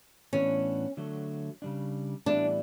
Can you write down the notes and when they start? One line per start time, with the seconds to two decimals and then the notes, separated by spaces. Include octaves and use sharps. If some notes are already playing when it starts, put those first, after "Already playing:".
0.33 A2 E3 B3 C#4 D4
0.97 D3 F#3 A3
1.62 C#3 G3 D4
2.26 A2 E3 G3 B3 D4 E4